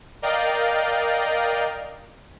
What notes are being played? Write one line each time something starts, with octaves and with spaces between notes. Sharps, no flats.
A#4 D5 D#5 F5 G5